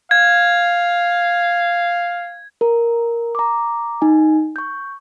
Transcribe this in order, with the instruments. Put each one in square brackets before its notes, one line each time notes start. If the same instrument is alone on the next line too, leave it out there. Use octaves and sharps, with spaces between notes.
[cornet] F5 [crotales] G#6
[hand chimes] A#4 A#5
A#5 D6
D#4 G#5
C#6 G6